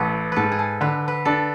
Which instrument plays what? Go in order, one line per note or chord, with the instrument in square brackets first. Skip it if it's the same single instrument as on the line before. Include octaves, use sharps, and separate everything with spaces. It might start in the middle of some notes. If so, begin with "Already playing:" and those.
Already playing: [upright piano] A1 [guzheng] A4 B4
[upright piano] G#2 [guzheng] A4 B4
[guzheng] G#4
A4
[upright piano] D3 [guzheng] B4
[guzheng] B4
[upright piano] D4 [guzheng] A4